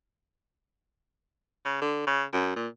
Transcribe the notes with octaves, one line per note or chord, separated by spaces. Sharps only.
C#3
D3
C#3
F#2
A#2